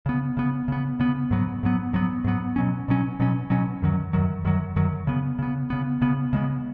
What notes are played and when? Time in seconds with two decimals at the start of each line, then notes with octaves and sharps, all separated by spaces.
0.06 C#3 B3
0.37 C#3 B3
0.68 C#3 B3
1.00 C#3 B3
1.31 G#2 F#3 B3
1.63 G#2 F#3 B3
1.93 G#2 F#3 B3
2.24 G#2 F#3 B3
2.56 B2 F#3 C#4
2.88 B2 F#3 C#4
3.20 B2 F#3 C#4
3.50 B2 F#3 C#4
3.82 F#2 D#3 F#3
4.13 F#2 D#3 F#3
4.45 F#2 D#3 F#3
4.76 F#2 D#3 F#3
5.07 C#3 B3
5.39 C#3 B3
5.70 C#3 B3
6.02 C#3 B3
6.33 C#3 G#3 B3